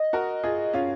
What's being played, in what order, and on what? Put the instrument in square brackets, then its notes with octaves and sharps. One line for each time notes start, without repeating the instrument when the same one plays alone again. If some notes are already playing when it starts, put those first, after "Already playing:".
Already playing: [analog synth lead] D#5
[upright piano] F#4 A#4
F4 G#4
[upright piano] C#4 F4 [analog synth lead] F5